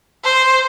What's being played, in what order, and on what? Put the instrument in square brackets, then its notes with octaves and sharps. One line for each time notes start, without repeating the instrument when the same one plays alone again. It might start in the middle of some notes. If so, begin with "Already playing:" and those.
[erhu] C5